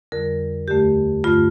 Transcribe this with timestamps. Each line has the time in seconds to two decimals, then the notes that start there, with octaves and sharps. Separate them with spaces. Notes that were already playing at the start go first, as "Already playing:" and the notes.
0.12 F2 D3 G3 A#4
0.68 D#2 D3 A3 G4
1.24 G2 D3 A3 F4